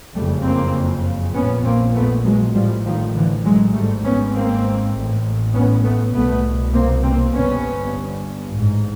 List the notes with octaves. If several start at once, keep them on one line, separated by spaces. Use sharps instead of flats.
F#1 F2 C#3 G3 A3
A#3 C4
A#1 A#2 B3 C#4
A#3 C4
A3 B3
F#3 G#3
A1 A2 F3 G3
D#3 F3
D3 E3
F#3 G#3
G#2 G3 A3
G#1
B3 C#4
A#3 C4
A1 A2
B3 C#4
A3 B3
C2 B2 A3 B3
A#3 C4
A#3 C4
G1 G2 B3 C#4
A1 G#2